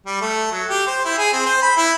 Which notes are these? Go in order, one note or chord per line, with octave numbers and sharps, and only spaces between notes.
G3
A3
F#3
G4
C5
E4
G#4
C4
C5
B5
E4